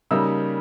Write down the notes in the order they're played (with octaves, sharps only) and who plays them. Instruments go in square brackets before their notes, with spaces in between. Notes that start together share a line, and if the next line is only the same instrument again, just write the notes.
[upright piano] C#3 G3 A#3 D#4 E6